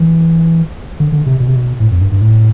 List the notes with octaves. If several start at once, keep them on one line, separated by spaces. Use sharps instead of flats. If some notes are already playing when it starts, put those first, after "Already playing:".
Already playing: E3
D3
D3
C3
B2
C3
B2
A2
F2
G2
G2
A2